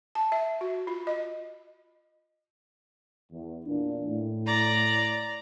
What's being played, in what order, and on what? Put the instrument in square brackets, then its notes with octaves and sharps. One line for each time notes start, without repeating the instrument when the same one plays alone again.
[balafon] A5
E5
F#4
F4
D#5
[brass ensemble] E2
E2 A#2 D4
A2
[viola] D5 A#5